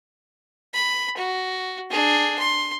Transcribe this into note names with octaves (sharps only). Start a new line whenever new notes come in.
B5
F#4
D4 G#4
C6